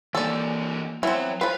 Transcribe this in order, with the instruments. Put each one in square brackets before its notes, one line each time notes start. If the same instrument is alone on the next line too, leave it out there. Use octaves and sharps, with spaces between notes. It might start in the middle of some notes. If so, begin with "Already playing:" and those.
[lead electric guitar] E3 A#3 [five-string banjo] A4 D5
[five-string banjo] E3 B3 C4 [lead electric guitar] F#3
[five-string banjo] F3 B4 [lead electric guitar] F5